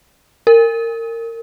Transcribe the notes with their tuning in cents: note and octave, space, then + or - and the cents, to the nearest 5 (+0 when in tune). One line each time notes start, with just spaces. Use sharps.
A#4 -25